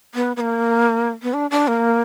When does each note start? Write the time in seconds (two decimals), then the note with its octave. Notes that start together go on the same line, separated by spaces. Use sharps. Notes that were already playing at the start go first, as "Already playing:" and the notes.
0.15 B3
0.36 B3
0.41 A#3
1.23 B3
1.34 D4
1.51 D4
1.68 A#3